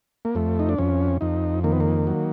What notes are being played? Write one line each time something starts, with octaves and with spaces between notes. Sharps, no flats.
A#3
F2 A3
D#4
D4
F2 C#4
F2 D#4
D#3 A#3
B3
A#3
F#3